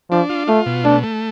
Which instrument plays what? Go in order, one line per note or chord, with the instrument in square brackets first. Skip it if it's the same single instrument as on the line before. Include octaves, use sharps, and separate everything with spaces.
[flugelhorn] F3 [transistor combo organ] D4
[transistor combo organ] F4
[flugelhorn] A3 [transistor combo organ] F4
[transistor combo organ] B2
[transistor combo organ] A3 [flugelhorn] D4
[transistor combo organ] A3